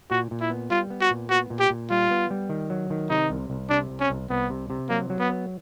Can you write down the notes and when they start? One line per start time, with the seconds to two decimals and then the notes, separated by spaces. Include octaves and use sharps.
0.10 A#2 F#4
0.31 A#2
0.41 E4
0.50 B3
0.71 G3 F4
0.90 B3
1.01 F#4
1.10 A#2
1.30 B3 F#4
1.50 A#2
1.60 G4
1.70 A#2
1.90 G3 F4
2.11 B3
2.30 G3
2.50 D#3
2.70 F#3
2.90 D#3
3.10 C3 D#4
3.30 C2
3.50 C2
3.69 C3 D4
3.90 C2
4.00 C#4
4.10 C2
4.29 C2 B3
4.50 C3
4.70 C3
4.89 F#3 A#3
5.10 F#3
5.19 B3
5.30 B3